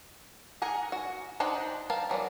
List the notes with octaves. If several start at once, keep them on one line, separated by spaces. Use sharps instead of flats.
G#4 A#4 F#5 G#5
F#4
D4 D#4 C5 F#5 G5
A#4 F5 G5 A5
E3 F#3 B3 D5